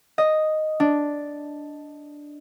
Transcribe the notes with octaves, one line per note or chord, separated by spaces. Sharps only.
D#5
D4